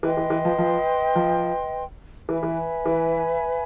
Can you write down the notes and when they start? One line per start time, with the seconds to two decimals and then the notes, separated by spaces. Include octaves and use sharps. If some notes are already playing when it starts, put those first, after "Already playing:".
0.03 E3 B4 D#5 G5 C6
0.17 E3
0.30 E3
0.45 F3
0.58 F3
1.15 F3
2.28 E3 B4 E5 G#5 B5
2.43 E3
2.86 E3